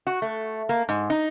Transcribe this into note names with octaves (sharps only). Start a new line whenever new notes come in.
F#4
A3
A#3
G#2
D#4